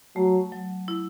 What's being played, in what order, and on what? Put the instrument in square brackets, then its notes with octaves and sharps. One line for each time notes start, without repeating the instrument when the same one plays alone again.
[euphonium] F#3 [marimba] A3
[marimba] F#3
E4